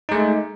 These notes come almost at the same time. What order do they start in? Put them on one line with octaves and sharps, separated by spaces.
D#4 G#3 A3